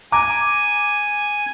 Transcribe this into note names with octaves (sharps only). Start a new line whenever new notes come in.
G#5 A#5 D6